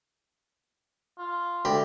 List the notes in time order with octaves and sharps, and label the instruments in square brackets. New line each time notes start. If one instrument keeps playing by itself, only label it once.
[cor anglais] F4
[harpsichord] D2 G4 B5